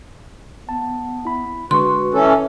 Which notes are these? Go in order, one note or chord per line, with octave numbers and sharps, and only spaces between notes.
B3 A5
E4 B5
D3 G#3 F#4 B4 C6 C#6
E3 C#4 A4